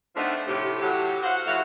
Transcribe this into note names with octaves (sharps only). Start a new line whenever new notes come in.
F3 A3 B3 C4 D4 D#4
A2 C3 G4
A2 F#3 G4
F#4 C5 F5 F#5
A2 E3 F3 F#4 E5 F5